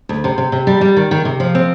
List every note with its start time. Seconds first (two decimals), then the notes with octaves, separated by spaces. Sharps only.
0.09 D2
0.24 C3
0.38 C3
0.52 C3
0.67 G3
0.81 G3
0.97 D#3
1.11 D#3
1.25 C3
1.40 F3
1.55 C4